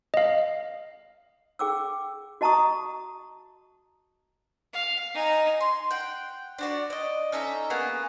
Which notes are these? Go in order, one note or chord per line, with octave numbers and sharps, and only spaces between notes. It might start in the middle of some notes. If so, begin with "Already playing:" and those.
D#5 F5
G#4 G5 D6 E6
F#4 D#5 A5 A#5 C#6 D#6
F5
D#4 G#5
C6
F#5 G5
D4 F#4 D5
D5 D#5
C#4 D#4 A4 E5
A#3 B3 G#4 C#6